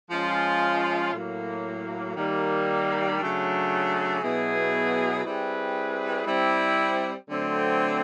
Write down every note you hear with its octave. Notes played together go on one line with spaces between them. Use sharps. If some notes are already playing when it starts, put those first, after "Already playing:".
F3 G#3 C#4 F4
A2 F#3 A#3
D#3 G3 A#3
C#3 F#3 A3 D4
B2 F#3 B3 E4 G#4
G3 C4 E4 G#4 B4
G3 C4 E4
D3 F#3 A3 C4